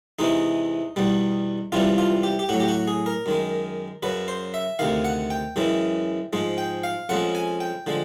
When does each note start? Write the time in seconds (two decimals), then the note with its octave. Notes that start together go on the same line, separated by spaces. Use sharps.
0.19 E2 C3 E3 G#3 D#4
0.96 E2 B2 G3
1.72 C#2 C3 E3 G3 F4
1.98 F4
2.23 G4
2.39 G4
2.49 A2 F#3 F#4
2.60 G4
2.68 F#4
2.88 G#4
3.06 A#4
3.26 F#2 D#3 G#3
4.03 F#2 C#3 F#3 B4
4.28 C5
4.54 E5
4.79 D2 C3 D#3 F5
5.05 F#5
5.30 G5
5.56 F#2 C#3 E3 G#3
6.33 G#2 F3 G#3
6.58 G5
6.84 F5
7.09 F2 C#3 F3 G#3 F#5
7.35 G#5
7.60 G5
7.87 D3 F3 G#3